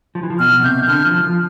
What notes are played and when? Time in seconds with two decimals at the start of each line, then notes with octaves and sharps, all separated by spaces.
0.15 F3
0.23 E3
0.30 F3
0.40 B2 F6
0.63 C3 G6
0.87 D3 F6
1.05 F3
1.24 F3